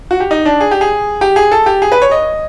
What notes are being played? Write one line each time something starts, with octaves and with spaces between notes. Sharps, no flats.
F#4
G4
D#4
D4
G#4
G4
G#4
G4
G#4
A4
G4
G#4
B4
C#5
D#5